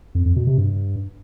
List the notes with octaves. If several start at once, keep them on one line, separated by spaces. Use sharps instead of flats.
F2
F2
B2
C3
G2